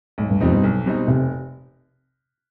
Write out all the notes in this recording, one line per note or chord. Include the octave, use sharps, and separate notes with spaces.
B1 G#2
G2
F2 B2 G3 C4 D#4
G2
B1
B2 G3 C4 D#4
F1 C3